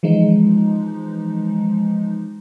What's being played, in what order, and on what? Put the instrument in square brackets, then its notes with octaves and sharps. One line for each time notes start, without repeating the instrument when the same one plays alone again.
[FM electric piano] E3 F3 G#3 D#4